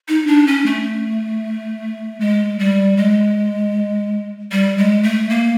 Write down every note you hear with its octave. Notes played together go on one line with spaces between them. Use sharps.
D#4
D4
C#4
A3
G#3
G3
G#3
G3
G#3
A3
A#3